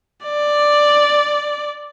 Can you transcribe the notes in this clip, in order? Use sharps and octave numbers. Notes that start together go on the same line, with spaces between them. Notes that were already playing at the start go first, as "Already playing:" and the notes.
D5